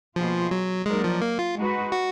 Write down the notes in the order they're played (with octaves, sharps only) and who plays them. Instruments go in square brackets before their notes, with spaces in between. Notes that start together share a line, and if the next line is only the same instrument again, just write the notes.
[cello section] B2 A#3 F4 G#4 [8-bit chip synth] F3
[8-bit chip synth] F#3
[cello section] F#3 A#3 D#4 A#4 D5 [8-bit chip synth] G#3
[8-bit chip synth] F3
A#3
F4
[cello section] G#3 D#4 F#4 B4
[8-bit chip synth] F#4